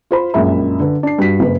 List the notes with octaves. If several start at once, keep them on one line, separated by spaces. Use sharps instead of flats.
F4 C5 B5
A#1 F#2 G#3 A#4 E5 B5
D3 B4
D4 C7
G2 F#4 B6
F#1 B4